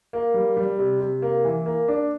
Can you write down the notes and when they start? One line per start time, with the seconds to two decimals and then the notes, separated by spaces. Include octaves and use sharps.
0.13 A#3
0.34 G3
0.57 G3
0.79 C3
1.00 C3
1.22 A#3
1.45 E3
1.66 A#3
1.88 D4